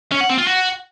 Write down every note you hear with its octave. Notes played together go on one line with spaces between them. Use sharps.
C#4
F#5
C4
F4
F#4